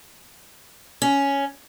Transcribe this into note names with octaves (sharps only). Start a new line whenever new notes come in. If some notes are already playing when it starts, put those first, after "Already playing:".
C#4